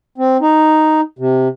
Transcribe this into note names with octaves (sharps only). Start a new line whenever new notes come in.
C4
D#4
C3